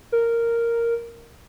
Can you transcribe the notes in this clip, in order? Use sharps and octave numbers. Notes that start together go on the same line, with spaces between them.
A#4